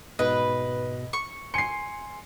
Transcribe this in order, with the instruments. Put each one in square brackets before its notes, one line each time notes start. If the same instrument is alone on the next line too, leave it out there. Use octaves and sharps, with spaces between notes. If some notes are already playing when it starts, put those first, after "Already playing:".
[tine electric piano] G#2 B2 [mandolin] B4 [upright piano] D#5
[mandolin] C#6
[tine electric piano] G#5 C6 [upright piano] C7 C#7